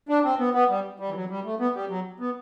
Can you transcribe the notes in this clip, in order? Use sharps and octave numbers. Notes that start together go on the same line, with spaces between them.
D4
C4
B3
B3
G3
G3
E3
F#3
G3
A3
B3
G3
F#3
B3